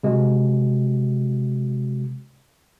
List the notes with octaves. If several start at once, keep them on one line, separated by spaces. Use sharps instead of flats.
C3 G#3 F#4